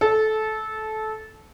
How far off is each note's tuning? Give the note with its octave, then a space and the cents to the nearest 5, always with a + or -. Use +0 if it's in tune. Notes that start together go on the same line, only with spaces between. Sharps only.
A4 -20